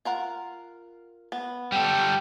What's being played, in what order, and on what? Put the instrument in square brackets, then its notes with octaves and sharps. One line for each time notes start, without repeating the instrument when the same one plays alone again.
[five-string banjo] F4 A#4 F#5
B3
[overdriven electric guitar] G3 A4 [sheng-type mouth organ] G5